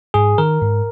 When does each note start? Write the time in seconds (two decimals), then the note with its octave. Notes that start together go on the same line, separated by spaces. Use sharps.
0.14 G#2 G#4
0.38 D#3 A#4
0.62 G#2